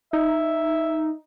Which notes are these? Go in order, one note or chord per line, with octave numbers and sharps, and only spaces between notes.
D#4 E5